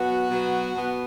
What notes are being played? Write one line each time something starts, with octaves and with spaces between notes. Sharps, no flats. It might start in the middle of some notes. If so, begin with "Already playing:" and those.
Already playing: B2 F#3 B3 F#4
B2 F#3 B3
B2 B3